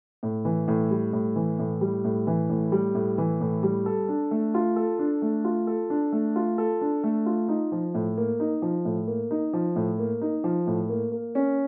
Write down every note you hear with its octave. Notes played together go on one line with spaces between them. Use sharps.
A2
E3
A2
G3
A2
E3
A2
G3
A2
E3
A2
G3
A2
E3
A2
G3
A4
D4
A3
F4
A4
D4
A3
F4
A4
D4
A3
F4
A4
D4
A3
F4
D#4
F3
A2
A#3
D#4
F3
A2
A#3
D#4
F3
A2
A#3
D#4
F3
A2
A#3
A#3
C#4